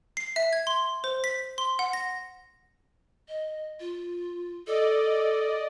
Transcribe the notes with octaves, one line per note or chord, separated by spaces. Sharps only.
C7
E5
G#6
C6
C5
B6
C6
F#5
A#6
D#5
F4
A4 D5 D#5